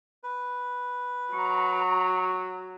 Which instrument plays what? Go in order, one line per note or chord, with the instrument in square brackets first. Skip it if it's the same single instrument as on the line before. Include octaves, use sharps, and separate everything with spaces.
[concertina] B4
[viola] F#3 [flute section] A#5 [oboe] C#6